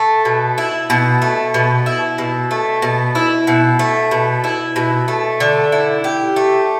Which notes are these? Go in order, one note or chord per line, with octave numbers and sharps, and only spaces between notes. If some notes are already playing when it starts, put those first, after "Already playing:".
Already playing: A3
B2
E4
B2
A3
B2
E4
B2
A3
B2
E4
B2
A3
B2
E4
B2
A3
D3
E4
G4
A3